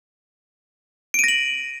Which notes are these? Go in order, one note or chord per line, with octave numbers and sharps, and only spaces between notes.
A#6 D7 D#7 F#7